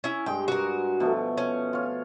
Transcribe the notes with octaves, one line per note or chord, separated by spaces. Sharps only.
C#4 E4
G2 G#3 G5
F#4 A#4
B2 F3 A3
C#4
F4 C#5